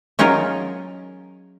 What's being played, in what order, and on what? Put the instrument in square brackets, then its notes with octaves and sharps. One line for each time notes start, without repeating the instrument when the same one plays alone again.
[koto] F#3 C#4 D#4 F4 G#4 A#4